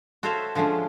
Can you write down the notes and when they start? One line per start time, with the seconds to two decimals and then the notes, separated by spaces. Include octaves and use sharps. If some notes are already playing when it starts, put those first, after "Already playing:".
0.23 F#4 A4 C5 C#5 E5 F5
0.55 D3 F3 G#3 A3 C#4